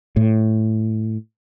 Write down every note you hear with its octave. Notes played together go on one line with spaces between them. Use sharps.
A2